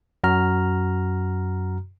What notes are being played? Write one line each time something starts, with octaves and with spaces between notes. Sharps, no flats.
F#2 F#4 A#5 F6